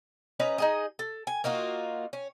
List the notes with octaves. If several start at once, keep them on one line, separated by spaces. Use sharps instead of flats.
C#4 D#4 B4 A#5
D#4 G#4 D#5
A4
G#5
A#3 D#4 F4 F#4
C#4